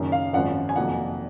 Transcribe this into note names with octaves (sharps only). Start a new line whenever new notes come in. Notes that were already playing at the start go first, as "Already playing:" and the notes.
Already playing: F#1 F#2 D#3
F5
G#1 F#2 F3 F#5
G#5
F1 F2 D#3 F#3 A#3 F#5